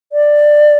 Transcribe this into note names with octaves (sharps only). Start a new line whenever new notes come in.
D5